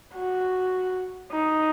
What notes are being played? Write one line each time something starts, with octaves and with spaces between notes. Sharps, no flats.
F#4
D#4